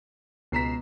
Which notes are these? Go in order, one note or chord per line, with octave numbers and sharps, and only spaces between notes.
C#2 B2 A#5 B6 C7 E7